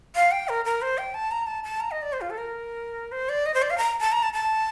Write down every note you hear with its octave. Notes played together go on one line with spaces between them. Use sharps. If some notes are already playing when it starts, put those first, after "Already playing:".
F5
G5
A#4
A#4
C5
G5
A5
A#5
A5
A5
A#5
D#5
D5
C5
F4
A4
A#4
C5
D5
D#5
C5
D5
F5
A#5
A5
A#5
A5
A5